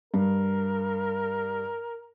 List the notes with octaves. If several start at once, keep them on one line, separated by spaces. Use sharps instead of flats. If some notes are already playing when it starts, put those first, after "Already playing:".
G2 A#4